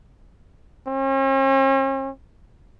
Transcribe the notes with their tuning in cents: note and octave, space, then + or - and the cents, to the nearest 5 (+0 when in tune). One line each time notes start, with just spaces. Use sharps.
C#4 -45